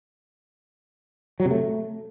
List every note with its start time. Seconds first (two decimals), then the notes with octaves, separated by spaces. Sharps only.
1.40 F#3
1.45 C3
1.51 A3